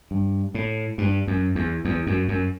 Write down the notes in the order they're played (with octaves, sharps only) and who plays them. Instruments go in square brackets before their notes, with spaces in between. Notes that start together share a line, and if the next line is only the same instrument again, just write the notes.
[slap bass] G2
A2
G2
F#2
E2
E2
F#2
F#2